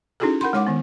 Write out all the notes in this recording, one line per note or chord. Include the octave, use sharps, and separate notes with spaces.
C#4 D#4 E4 F#4 G#4 A4
A#4 F#5 B5 C6
G#3 D#4 C#5 F#5 D6
D#3 B3